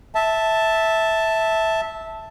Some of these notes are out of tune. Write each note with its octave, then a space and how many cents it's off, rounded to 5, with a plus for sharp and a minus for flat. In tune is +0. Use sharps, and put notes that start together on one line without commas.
E5 -10 A5 +0